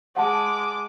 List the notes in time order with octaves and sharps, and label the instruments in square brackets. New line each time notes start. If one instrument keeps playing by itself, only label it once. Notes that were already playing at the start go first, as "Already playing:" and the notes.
[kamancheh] G#3 D6 [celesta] F#5 A5